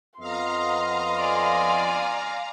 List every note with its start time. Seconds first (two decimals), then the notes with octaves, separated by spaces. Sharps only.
0.20 F2 B3 D#5 F5 A#5 C6
1.19 D5 G#5